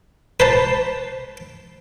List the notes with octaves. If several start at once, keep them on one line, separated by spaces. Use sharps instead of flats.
B4 C5 A5